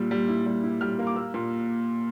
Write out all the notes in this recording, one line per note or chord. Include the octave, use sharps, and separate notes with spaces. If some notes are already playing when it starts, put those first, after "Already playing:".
Already playing: A#2 G3 E6
G3
E4
G3
E4
G3 F6
A#3
D6
A#3 E6
A#2